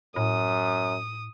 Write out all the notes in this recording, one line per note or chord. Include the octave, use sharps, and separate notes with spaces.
F#2 A2 D#6